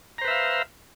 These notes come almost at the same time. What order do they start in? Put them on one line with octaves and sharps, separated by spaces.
A#5 C5 B4 E5 F5